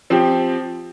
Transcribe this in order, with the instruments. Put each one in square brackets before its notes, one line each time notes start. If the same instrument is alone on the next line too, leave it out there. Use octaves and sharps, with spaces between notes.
[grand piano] F3 C4 G4